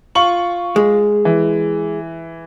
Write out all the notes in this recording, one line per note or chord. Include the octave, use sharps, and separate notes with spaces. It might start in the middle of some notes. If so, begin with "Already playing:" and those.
F4 C#6 F#7
G#3
E3